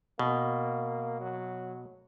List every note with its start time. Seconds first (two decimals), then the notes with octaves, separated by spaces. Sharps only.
0.19 B2 A#3
1.20 F#3